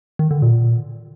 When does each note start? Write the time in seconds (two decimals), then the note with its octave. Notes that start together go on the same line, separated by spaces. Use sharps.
0.19 D#3
0.31 D3
0.42 A#2